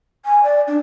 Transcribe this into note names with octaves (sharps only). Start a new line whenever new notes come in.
G#5
D5
D4